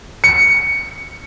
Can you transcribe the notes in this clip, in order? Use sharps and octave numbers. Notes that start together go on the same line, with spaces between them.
C#7